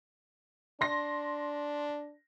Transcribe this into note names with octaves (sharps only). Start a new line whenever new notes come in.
D4 C6 A#6